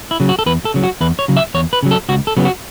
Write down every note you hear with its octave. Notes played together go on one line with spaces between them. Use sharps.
E4
C#3 F#3
F#4
A4
E2 B4
A4
C#3 F#3
F#4
E2 B4
C#5
C#3 F#3
E5
E2 C#5
B4
C#3 F#3
A4
C#2 F#4
A4
C#3 F#3 B3
F#4